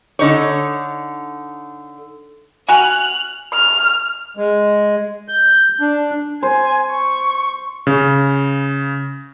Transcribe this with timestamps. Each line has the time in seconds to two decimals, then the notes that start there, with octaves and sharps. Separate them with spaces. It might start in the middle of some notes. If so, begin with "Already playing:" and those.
0.19 D3 D#4 C#5
2.68 F#4 G#5 F6 F#6
3.53 F6
4.37 G#3
5.28 G6
5.81 D4
6.43 C5 G#5
6.91 C#6
7.87 C#3